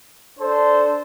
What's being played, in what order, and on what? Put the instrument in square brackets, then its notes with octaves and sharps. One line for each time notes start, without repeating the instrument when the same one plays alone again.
[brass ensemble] D4 A4 C5